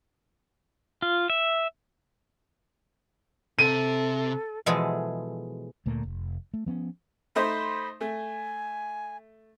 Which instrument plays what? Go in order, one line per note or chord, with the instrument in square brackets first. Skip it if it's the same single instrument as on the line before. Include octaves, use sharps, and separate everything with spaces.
[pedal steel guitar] F4
E5
[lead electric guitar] C3 [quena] A4 [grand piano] D#7
[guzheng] B2 E3 F3 G#3 G#4 A4
[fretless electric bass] D2 A#2 A3 A#3
F1
A3
F3 B3 C#4
[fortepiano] A3 D#4 C5 [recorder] B5
[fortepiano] A3 [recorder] G#5